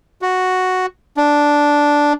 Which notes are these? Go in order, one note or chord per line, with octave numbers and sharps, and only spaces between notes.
F#4
D4